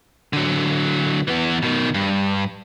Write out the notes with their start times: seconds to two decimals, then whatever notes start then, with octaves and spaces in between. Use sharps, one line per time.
0.33 D3 F#3
1.28 E3 B3
1.62 B2 D#3
1.94 G2